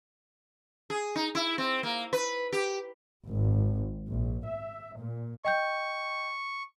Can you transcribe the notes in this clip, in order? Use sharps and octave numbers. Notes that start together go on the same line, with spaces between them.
G#4
D#4
E4
C4
A#3
B4
G4
G#1
A#1
E5
A#2
D#5 G5 C#6 G6